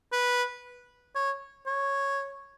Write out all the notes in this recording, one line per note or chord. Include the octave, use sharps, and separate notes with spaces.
B4
C#5
C#5